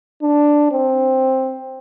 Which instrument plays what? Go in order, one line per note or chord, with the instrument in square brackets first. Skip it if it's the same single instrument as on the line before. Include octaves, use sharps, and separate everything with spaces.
[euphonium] D4
C4